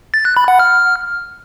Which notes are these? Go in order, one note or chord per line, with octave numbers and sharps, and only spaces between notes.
A6
F#6
B5
F#5
F6